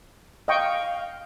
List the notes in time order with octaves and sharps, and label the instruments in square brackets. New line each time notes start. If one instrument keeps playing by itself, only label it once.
[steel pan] D#5 G5 C#6 [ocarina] F5